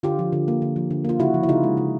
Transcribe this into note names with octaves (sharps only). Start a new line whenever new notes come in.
D3 F4 G4
F3
D3
A#3
D3
F3
D3
A#3 F4
C#3 E4 F#4
F3
E4
C#3 D#4 F4
G#3
C#3